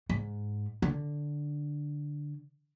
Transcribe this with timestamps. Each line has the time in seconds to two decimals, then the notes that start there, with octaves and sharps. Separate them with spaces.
0.09 G#2
0.82 D3